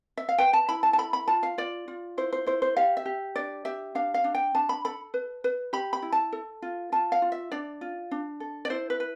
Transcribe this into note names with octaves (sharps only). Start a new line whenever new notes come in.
E5
F5
B4 G5
A5
E4 B5
A5
A5
A4 B5
B5
F4 A5
F5
F4 D5
F4
E4 C5
C5
E4 C5
C5
G4 F5
E5
G4
D4 D5
G4 E5
D4 F5
F5
D4
G5
D4 A5
B5
A4 B5
B4
B4
G4 B5
B5
E4
A5
A4
F4
F4 A5
F5
F4
E5
D4 D5
F4
D4
A4
D5
E4 C5
B4
B4